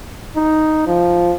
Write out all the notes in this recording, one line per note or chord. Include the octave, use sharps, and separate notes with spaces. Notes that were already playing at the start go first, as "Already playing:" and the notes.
D#4
F3